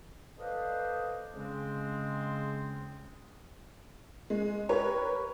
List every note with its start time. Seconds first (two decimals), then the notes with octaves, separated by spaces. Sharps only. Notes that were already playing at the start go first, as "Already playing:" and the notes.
0.39 A4 B4 C5 D5 D#5 F5
1.34 C#3 G#3 C4
4.30 G#3
4.69 G4 A#4 B4 C#5